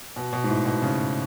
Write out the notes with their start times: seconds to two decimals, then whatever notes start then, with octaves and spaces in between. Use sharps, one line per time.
0.16 B2
0.33 B2
0.44 G#2
0.49 A2
0.66 B2
0.82 C#3